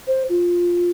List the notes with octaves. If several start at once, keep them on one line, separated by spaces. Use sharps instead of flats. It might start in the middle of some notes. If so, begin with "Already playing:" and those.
C5
F4